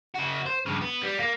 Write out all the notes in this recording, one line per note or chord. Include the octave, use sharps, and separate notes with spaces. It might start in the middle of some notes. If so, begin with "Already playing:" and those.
C#3 F#4
C5
G2 C#3
B3
G3
A#3